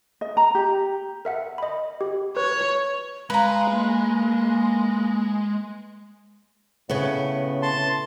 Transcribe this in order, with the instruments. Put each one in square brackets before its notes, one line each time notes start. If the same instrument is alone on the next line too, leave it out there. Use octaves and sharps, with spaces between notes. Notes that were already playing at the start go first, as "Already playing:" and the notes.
[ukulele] D#5
A#5
G4
[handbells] A#4 E5 F#5
D#5 B5
G4
[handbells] B4 [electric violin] C#5
[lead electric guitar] G#3 [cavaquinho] B4 A#5 [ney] F5
[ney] A#3
[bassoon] A2 [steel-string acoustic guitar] C#3 B3
[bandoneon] A5 C6